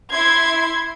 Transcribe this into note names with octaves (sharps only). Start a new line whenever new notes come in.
E4 C6 G#6